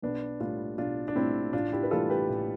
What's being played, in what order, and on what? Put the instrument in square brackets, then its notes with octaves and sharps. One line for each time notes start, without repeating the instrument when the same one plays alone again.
[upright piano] B1 B3 D4
A2 G3 D4 F4
B1 D4 F4
D4
A2 G3 C4 E4
A1 D4 F4
E4 G4
B4
A2 E3 G3 F4 A4
G4 B4
A1